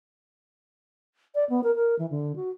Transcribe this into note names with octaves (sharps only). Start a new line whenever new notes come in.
D5
B3
A#4
A#4
E3
D3
F#4